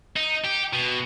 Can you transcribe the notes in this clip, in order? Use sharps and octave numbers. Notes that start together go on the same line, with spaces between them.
D#4
G4
B2